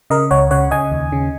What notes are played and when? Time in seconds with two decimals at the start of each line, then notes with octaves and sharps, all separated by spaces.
0.10 C#3 A#4 D#5
0.31 C#2 C#5 F#5
0.51 C#3 C#5 F#5
0.71 C#3 D#5 G#5
0.92 D#2
1.12 C#3